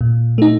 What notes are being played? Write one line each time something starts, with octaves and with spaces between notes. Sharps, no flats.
A#2
A3 D#4